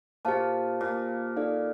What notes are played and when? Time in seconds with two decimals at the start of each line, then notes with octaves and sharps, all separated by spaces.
0.25 A#2 G4 C5 F5 A5
0.81 A#2
1.37 D#4 A4 D5 F5